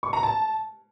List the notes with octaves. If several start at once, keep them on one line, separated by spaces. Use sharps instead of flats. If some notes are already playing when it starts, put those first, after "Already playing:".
C#6
A#5
A5